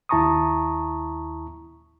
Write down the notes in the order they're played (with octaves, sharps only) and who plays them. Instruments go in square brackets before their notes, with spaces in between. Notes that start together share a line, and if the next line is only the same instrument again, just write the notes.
[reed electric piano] D#2 E4 A5 A#5 C#6 D#6